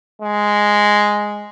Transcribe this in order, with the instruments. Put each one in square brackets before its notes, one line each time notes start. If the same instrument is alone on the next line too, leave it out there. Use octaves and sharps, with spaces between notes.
[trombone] G#3